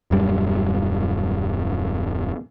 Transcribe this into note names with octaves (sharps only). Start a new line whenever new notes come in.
D#1 F#2 G3